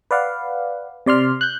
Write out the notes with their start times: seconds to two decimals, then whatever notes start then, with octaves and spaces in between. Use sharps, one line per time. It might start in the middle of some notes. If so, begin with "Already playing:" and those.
0.11 B4 D5 F5 F#5
1.06 C3 D5 C6 F6
1.41 F#6 G6